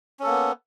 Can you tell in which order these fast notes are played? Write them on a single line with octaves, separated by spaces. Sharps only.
C#4 A4 A#3 B3